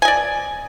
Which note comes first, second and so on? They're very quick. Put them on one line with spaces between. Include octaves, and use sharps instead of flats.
G#5 D#5 D5